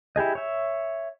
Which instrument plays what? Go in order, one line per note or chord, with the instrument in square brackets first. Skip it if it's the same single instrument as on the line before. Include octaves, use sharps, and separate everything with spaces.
[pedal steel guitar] E4 G4 G#4 D#5
C#5 E5